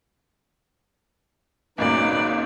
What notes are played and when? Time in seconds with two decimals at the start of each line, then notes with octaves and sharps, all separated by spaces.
1.78 G#1 C#2 A#2 F#3 D#4 B4 D5